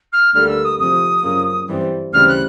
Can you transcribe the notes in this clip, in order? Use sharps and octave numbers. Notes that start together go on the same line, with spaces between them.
F6
D2 D3 G3 A#3 F6
E6
D#6
F2 C3 F3 D#6
F#2 C#3 F3 A#3
G2 E3 G3 C4
D2 C#3 E3 G3 C4 F6
F#6